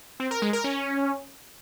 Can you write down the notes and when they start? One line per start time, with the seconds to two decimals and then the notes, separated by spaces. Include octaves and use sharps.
0.20 C4
0.31 A#4
0.42 G#3
0.53 A#4
0.64 C#4